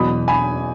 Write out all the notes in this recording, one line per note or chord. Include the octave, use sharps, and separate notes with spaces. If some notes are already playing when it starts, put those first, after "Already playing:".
Already playing: E2 B2 F#3 B5 D#6
G#5 B5